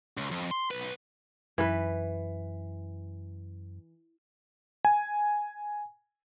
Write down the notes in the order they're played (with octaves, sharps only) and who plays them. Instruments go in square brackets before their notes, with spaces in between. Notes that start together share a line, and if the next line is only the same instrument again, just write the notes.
[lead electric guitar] C#2
F2
C6
B1 B4
[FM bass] F#2 [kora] E3 B4
[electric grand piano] G#5